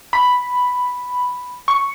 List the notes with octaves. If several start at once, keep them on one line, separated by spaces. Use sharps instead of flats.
B5
C#6